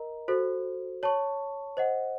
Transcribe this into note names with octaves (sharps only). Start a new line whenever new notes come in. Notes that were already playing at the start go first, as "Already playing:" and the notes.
Already playing: A#4 D#5 A#5
F#4 A4 C5
C#5 A5 C#6
C5 D#5 F#5